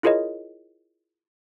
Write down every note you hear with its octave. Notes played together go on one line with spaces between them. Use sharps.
E4 F4 G#4 A#4 C#5 D#5